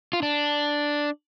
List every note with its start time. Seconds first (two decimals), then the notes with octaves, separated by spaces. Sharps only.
0.13 F4
0.23 D4